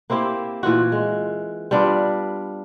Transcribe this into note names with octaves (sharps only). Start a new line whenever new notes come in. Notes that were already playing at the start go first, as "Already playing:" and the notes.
A#3 C4 E4 G4
A#2 E3 F4 F#4
G#3
G3 B3 D4 F4